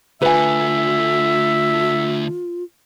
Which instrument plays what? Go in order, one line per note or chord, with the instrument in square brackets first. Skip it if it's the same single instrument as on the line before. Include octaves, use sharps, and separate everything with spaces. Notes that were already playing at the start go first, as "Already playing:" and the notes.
[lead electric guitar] D3 A3 [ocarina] F4 [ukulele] B4 G#5 [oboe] E5